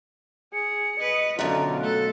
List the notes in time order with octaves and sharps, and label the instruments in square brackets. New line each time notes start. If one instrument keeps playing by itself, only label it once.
[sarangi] G#4 [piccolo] C#7
[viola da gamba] B4 [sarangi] D#5
[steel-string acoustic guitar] F#2 B2 [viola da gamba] D3 [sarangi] F4 [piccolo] A#5
[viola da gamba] A3 A4 [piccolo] F#6